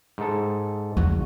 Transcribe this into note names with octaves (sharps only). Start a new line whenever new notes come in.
G#2 A4
E2 C#3 F#4